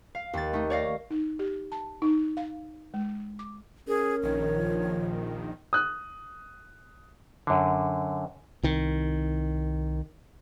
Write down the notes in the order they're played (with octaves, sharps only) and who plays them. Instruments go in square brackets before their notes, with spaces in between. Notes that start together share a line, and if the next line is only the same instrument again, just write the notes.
[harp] F5
D#2 A6
A3 D#4
C#5 D5 F5 A#6
[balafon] D#4
G4
A5
D#4
F5
G#3
D6
[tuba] C#4 [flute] G#4 [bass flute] A#4
[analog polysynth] A#1 D#3 [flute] C#5
[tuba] F3
[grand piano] D#6 F#6
[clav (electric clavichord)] F#2 D3
[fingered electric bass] C2 D#3